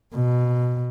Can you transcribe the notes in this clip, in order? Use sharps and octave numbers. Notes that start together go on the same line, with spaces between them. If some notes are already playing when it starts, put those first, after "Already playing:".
B2